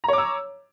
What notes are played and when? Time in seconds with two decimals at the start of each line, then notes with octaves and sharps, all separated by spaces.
0.04 A#5
0.08 C#5
0.13 D6
0.18 E6